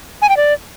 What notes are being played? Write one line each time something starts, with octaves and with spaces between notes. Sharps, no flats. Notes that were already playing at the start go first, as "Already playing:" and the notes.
G#5
G5
D5